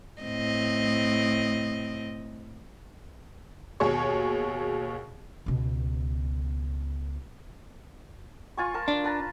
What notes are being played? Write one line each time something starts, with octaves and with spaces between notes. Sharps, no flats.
A2 C4 D#5
D#2 B2 G#4 C#5 C#6
C#2 B2
F4 G#5 C#6
A#4 A5
D4
B4 A5 A#5